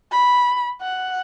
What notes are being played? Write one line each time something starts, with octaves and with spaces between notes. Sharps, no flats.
B5
F#5